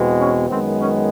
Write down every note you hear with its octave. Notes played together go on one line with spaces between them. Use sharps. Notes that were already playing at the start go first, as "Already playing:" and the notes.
Already playing: E2 B2 G#3 C4
C#4
F#2 D#3 G#3 B3 C4
C#4